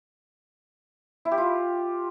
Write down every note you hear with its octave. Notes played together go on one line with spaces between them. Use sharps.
E4
G4
F4